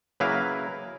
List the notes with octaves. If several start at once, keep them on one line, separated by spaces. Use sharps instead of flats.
C#3 F#3 A#3 E4 B4 F5